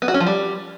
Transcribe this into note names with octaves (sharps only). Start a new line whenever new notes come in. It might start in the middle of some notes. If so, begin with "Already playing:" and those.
B3
F#4
C#4
F3
G3